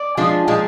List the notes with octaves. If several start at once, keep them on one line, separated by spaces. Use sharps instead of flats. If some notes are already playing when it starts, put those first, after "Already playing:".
Already playing: D5
F3 G#3 D4 F4
A#2 F3 G#3